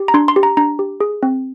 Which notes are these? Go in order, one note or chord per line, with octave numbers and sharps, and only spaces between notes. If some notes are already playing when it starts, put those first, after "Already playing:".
Already playing: G4
A#5
D4 C6
C6
G4
A#5
D4 A#5
G4
G#4
C4